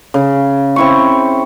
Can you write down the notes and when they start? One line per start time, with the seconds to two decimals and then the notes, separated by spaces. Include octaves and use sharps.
0.14 C#3
0.76 C4 E4 C#6